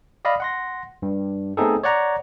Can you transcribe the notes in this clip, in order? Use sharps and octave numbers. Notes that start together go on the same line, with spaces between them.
D5 D#5 F5 B5
F#5 C6 A#6
G2
A3 B3 C4 D#4 G#4 A4
C#5 D5 F#5 A#5